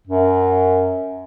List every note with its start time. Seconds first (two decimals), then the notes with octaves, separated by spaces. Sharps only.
0.07 F#2